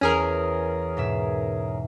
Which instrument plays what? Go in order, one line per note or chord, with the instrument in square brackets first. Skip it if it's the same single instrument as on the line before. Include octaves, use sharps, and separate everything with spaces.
[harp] E2 [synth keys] C#4 G#4 A#4
[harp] G#2 B2 E5